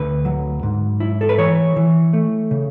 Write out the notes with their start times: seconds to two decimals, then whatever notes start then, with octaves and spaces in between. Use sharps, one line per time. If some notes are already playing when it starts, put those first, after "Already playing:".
Already playing: D2 B4
0.25 F#3
0.63 G#2
1.00 E4
1.21 A4
1.29 B4
1.38 E3 C#5
1.76 E3
2.13 A3
2.51 C#3